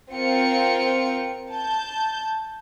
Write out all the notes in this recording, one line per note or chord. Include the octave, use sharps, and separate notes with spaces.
C4 F4 A#4 G5 C#7
A5 G6